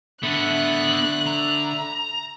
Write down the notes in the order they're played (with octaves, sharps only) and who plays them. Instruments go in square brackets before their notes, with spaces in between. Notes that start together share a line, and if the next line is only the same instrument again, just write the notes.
[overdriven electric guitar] D3 [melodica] A3 E5 B5 [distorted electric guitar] B3 A4 [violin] F#6
[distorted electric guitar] A#5